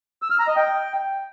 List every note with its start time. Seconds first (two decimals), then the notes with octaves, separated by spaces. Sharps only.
0.22 E6
0.31 F6
0.39 A#5
0.48 D#5
0.56 G5